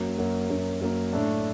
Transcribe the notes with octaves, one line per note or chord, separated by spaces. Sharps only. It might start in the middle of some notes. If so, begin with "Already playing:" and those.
Already playing: F#2 F#3 A#3
F#2 F#3 A#3
F#2 F#3 A#3
F#2 F#3 A#3
A2 A3 D4